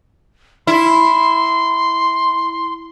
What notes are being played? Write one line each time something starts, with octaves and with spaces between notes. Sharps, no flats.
E4 C6